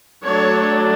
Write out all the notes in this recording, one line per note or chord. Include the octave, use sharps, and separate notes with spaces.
F#3 A3 D4 C#5